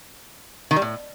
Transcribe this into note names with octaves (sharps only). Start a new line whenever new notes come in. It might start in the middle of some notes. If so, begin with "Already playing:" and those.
D#3
G3
A2